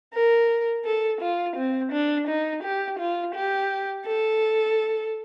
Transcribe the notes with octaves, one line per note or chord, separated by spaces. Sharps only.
A#4
A4
F4
C4
D4
D#4
G4
F4
G4
A4